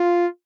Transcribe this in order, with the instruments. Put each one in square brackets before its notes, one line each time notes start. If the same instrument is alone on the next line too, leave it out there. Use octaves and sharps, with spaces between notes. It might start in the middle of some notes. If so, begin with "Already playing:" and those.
Already playing: [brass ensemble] F4